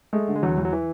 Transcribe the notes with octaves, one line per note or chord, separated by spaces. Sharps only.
G#3 A3
D3
G#3
E2 F#3
E2
F#3
E3